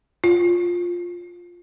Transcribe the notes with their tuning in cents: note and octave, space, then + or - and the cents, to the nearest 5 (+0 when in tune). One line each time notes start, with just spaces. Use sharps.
F4 +5